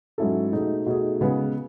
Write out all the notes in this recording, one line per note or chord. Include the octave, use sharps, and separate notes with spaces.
G#2 F#3 C#4 E4 A4
B2 A3 D#4 G#4
B2 A3 D#4 G#4
C#3 G#3 B3